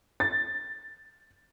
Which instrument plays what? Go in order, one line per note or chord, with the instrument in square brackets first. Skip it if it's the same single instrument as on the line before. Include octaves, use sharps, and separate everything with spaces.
[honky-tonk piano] A6